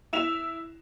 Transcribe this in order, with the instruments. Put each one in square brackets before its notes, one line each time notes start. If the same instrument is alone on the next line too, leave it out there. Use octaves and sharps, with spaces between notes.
[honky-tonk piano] E4 E7 F7